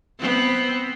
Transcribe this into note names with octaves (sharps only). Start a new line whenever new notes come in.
B3 C4